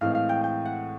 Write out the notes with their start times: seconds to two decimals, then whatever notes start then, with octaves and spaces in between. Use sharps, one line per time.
0.01 A2 E3 G#3 C4 F5
0.15 F5
0.29 G5
0.44 G5
0.65 F#5